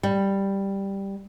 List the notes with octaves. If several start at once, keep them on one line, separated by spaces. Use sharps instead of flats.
G3